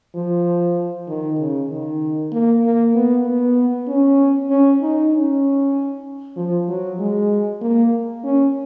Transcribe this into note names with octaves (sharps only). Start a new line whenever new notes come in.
F3
D#3
C#3
D#3
A#3
A#3
B3
B3
C#4
C#4
D#4
C#4
F3
F#3
G#3
A#3
C#4